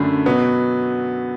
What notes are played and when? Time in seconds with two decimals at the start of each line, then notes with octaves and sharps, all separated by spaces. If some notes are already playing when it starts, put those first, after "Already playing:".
Already playing: F#2 D3 A3 B5
0.25 B2 F#3 B3